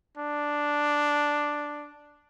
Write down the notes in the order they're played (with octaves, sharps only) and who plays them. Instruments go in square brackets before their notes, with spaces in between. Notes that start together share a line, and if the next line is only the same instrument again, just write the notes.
[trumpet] D4